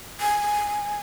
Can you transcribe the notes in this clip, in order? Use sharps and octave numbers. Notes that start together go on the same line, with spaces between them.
G#5